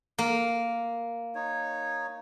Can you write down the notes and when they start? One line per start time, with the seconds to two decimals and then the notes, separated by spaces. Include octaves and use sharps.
0.18 A#3
1.35 D#4 C#5